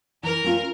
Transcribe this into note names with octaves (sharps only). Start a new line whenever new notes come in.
E3 A#4
A3 C#4 F4